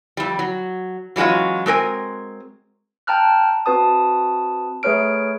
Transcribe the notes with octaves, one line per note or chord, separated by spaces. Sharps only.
F2 G3
F#3
E3 F#3 G#3 C#4 F4
G#3 C4 A#4 G#5
G5 A5 A#5 F6 F#6
C4 F#4 B4 A5 D#6
A3 G#4 B4 C#5 F6 D7